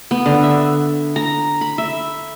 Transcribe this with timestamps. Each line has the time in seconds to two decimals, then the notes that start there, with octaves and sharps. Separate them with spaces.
0.11 B3
0.26 D3
0.43 E5
1.16 A#5
1.61 B5
1.78 E5